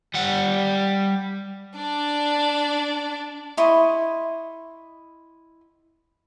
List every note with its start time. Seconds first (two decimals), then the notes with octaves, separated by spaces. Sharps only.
0.14 G3 F#5
1.76 D4 D5
3.57 E4 D#5 C6 C#6